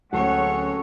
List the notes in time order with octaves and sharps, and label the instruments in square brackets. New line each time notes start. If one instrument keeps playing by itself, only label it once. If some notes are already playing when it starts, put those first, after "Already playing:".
[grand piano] D1 [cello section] G#3 C#4 C#5 [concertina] F#4 A4 [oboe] F#5